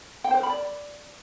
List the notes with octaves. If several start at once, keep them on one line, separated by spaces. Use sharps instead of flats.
G5
C5
A#4
B5
D5